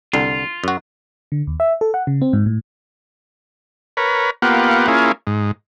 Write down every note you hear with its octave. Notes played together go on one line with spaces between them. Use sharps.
C2 D3 F4
F#2 F#4
D3
D#2
E5
A4
F#5
C#3
C4
G#2
A2
A#4 B4 C#5
A#3 B3 F4 G4 F#5
A#3 C#4 E4 F4 G#4
G#2